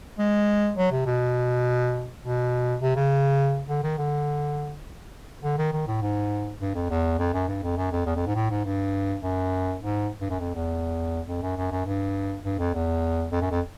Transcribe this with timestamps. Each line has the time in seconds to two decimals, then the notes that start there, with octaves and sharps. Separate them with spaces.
0.18 G#3
0.77 F#3
0.92 C3
1.06 B2
2.23 B2
2.81 C3
2.95 C#3
3.69 D3
3.83 D#3
3.98 D3
5.43 D3
5.58 D#3
5.73 D#3
5.87 A2
6.01 G#2
6.61 G2
6.75 F2
6.90 E2
7.19 F2
7.33 F#2
7.48 G2
7.63 F2
7.77 F#2
7.92 F2
8.06 E2
8.16 F2
8.26 G#2
8.35 A2
8.50 G#2
8.65 G2
9.23 F#2
9.82 G#2
10.21 G2
10.30 F#2
10.40 F2
10.55 E2
11.28 F2
11.42 F#2
11.57 F#2
11.71 F#2
11.86 G2
12.44 G2
12.59 F2
12.74 E2
13.32 F2
13.41 F#2
13.51 F2